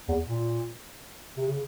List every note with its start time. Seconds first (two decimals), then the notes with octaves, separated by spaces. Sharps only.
0.09 E2
0.27 A#2
1.37 C3
1.47 C#3